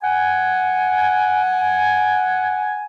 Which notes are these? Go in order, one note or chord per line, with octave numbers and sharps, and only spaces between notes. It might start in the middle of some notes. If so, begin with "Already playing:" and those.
F#5 G#5